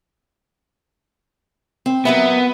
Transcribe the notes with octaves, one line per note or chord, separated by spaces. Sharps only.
C4
F#3 A#3 B3 E5